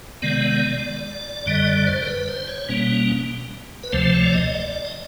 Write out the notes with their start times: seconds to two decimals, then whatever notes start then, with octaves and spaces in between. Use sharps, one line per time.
0.22 C3 D#3 G#3 B3 D5
1.46 F#2 D3 G3 D#5
1.67 D5
1.87 C5
2.02 A#4
2.07 B4
2.29 C5
2.48 C#5
2.69 B2 G3 A#3 C#4
3.84 B4
3.92 D2 C3 F3 A3 C5
4.04 C5
4.14 C#5
4.25 D5
4.33 D#5
4.54 D5
4.85 D#5